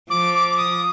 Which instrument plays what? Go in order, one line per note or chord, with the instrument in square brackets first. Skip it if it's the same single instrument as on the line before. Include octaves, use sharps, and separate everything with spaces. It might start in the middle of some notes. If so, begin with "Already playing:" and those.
[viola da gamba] F3 [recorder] D6
[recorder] D6
D#6